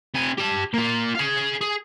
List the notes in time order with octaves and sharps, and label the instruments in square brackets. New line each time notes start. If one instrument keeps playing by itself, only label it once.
[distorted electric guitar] C3 G#5
G4 A5
A#3 F4
G#4 F5
G#4